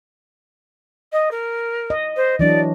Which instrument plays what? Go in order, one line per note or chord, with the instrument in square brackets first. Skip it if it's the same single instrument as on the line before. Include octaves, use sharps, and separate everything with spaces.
[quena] D#5
A#4
[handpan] D#5
[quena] C5
[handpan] E3 F#3 D4 [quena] D5